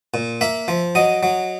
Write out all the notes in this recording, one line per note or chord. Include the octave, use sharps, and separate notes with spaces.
A#2
A#3 E5
F3
F#3 D#5
F#3